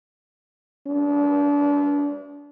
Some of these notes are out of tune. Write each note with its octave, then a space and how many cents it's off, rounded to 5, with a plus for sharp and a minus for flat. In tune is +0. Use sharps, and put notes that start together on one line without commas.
D4 -30